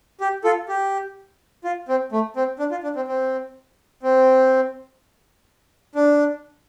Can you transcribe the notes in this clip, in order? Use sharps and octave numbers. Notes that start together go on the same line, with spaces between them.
G4
F4 A4
G4
F4
C4
A3
C4
D4
F4
D4
C4
C4
C4
D4